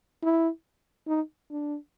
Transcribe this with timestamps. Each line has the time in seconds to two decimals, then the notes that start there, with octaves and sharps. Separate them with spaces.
0.23 E4
1.08 D#4
1.50 D4